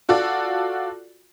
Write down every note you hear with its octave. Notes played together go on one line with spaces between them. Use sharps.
F4 F#4 A4 D5